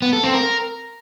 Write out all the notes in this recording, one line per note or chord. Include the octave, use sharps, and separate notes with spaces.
B3
A4
C4
A#4